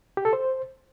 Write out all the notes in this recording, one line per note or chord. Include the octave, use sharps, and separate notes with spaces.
G4
A4
C5